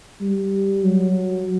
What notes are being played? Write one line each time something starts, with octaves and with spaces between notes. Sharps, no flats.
G3
F#3